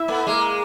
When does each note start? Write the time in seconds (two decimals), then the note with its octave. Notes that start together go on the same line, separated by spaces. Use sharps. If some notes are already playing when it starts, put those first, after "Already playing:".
Already playing: E4 E5
0.08 A3 B3
0.27 G#3 A#3